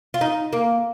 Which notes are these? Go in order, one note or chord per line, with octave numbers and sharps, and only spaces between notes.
F4
D#4
A#3